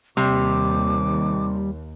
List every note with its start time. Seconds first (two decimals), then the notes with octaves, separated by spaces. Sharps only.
0.17 D#2 C3 G3 D6